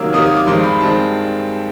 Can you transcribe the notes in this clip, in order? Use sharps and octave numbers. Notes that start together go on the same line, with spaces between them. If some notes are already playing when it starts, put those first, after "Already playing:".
Already playing: C3 D#3 F#3 A#3 E6
C3 D#3 F#3 A#3 D#6
D#6
D6
G2 D#3 G#3 C4 C6
B5
D#3 G#3 C4 A5